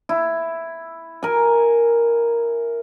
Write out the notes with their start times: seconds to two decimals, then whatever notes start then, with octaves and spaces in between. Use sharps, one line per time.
0.09 E4
1.23 A#4 G#5